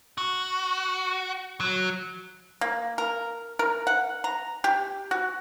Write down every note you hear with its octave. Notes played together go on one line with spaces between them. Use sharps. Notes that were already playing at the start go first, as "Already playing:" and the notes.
F#4
F#3
A#3
A#4
A#4
F#5
A#5
G4
F#4